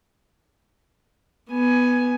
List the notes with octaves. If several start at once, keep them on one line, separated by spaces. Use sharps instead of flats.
B3 G#5